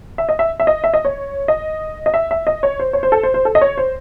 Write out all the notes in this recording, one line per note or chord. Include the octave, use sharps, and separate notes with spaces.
E5
D#5
E5
E5
D#5
E5
D#5
C#5
D#5
D#5
E5
E5
D#5
C#5
C5
C#5
C5
A4
C5
C5
A4
D#5
C#5
C5